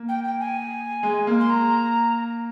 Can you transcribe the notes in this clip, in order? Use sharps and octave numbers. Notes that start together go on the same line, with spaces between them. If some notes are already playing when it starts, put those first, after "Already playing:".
Already playing: A#3
G5
G5
G#5
G#3
A#3
C6
A#5